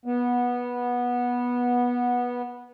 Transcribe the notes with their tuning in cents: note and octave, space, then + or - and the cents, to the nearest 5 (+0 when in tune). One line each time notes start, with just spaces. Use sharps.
B3 -15